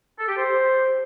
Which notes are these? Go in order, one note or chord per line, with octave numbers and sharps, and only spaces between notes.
A4
G4
C5